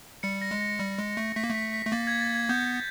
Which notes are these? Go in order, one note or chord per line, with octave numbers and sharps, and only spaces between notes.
G3 C#7
A#6
G#3
A#6
G3
G#3
A3
A3 B6
A#3
A3 B6
B6
A3
A#3 A6
G#6
A6
G#6
B3 G6